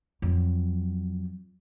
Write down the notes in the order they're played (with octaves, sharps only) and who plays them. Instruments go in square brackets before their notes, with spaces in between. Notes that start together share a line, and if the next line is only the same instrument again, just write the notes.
[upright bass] F2 F#3